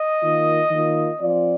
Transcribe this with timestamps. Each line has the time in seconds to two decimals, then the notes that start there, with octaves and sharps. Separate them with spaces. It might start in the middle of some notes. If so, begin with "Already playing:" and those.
Already playing: D#5
0.23 D#3 A#3 F4
0.71 D#3 A#3 F4
1.19 F3 C4 F4 D5